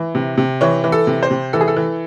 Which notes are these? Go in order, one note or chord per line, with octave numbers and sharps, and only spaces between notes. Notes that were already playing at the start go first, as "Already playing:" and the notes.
Already playing: E3
C3
C3
E3 C#5
E3
A4
C3
C5
C3
E3 A4
G#4
A4
E3